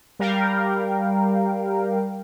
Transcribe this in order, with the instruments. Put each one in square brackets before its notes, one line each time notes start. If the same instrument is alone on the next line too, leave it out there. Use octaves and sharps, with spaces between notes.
[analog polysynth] G3 A#4 F5 G5